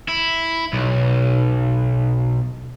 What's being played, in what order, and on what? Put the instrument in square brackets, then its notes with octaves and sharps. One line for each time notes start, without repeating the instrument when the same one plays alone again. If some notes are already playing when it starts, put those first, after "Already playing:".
[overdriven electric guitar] E4
B1